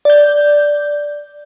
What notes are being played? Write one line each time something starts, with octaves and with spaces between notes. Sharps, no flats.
D5 G6